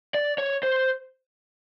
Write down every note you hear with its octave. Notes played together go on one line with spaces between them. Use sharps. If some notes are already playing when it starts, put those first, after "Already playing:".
D5
C#5
C5